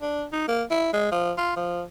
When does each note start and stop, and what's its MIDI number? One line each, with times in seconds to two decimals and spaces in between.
0.02 0.24 62
0.32 0.47 63
0.48 0.63 58
0.71 0.88 64
0.93 1.07 56
1.11 1.32 53
1.37 1.53 65
1.56 1.83 53